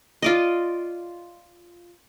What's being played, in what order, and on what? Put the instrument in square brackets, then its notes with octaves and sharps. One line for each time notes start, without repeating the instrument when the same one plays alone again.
[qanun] F4 D5 D#5